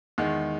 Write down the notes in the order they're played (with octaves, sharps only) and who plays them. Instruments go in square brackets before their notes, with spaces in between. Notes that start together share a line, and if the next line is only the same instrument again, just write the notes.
[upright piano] E2 D#3 G#3